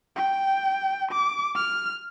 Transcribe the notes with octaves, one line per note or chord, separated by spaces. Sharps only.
G5
D6
F6